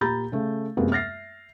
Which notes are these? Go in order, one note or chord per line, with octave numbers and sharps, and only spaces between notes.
A#2 G4 A#5 B5 G6 A6
C#3 A3
F#2 C3 G#3 A#3 B3
E5 F6 A6 A#6 C7